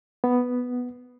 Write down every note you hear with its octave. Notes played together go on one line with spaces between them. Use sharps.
B3